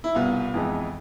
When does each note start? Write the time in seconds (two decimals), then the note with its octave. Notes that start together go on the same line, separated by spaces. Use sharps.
0.04 E4
0.15 C2 B2 B3 F4
0.54 F2 E3 G#3 B3